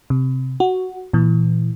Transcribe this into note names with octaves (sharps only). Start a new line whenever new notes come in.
C3
F#4
A#2 E3